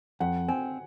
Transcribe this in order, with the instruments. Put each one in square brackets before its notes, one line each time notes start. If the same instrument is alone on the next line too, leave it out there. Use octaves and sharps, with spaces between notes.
[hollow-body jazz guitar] F2 [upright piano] F#5
[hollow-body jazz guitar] C4 [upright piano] G#5